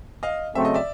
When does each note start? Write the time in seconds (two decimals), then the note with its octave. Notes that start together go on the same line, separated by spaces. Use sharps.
0.23 D#5 F5
0.55 C#3 F#3 A3 C4 E5
0.65 D#5
0.74 D5 E5